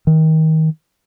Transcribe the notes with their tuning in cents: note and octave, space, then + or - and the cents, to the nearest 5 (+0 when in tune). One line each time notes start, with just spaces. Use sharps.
D#3 +30